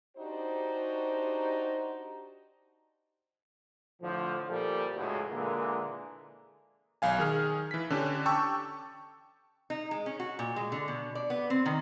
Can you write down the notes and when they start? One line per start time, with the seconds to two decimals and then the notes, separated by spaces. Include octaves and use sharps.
0.18 D4 D#4 F#4 G4 C5
4.02 A2 D3 F3
4.49 A#2 F3 G3 A4
4.96 C#2 A2 G#3 F#4
5.32 A#2 D3 E3 G#3 A#3
7.02 B1 F5 G#5
7.18 D#3 G#4 F6
7.71 E3 B6
7.90 D3 C#4 D4 G4
8.26 G5 A5 C#6 D6 E6
9.70 D#4
9.91 G#3
10.06 C#4
10.20 F#4
10.39 A#2
10.56 G#3
10.72 D3
10.88 B2
11.15 D5
11.30 B3
11.50 C4
11.66 D#3